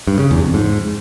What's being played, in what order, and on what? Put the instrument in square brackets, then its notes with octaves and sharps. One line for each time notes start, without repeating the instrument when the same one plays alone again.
[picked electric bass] G2
C#3
E2
F2
G#2